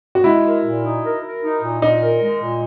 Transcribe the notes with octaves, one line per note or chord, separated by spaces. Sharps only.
F#4
G#3 E4
A#4
A#2
D#4
A#4
A#4
D#4
A#2
A#2 D#4
A#4
G#3
A#2